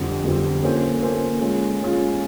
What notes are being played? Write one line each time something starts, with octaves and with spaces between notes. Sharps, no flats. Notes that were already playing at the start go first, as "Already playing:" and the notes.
Already playing: F2 D3 G3 C4
F2 D3 G3 C4
A#3 C#4 F4 A4 C5
A#3 C#4 F4 A4 C5
G#3 C#4 F4
G#3 C#4 F4